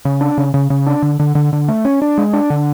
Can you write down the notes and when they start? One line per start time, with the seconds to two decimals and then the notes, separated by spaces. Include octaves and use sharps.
0.05 C#3
0.21 D4
0.38 C#3
0.54 C#3
0.70 C#3
0.87 D4
1.02 D3
1.20 D3
1.35 D3
1.53 D3
1.68 A3
1.85 C#4
2.02 D4
2.18 G#3
2.33 D4
2.50 D3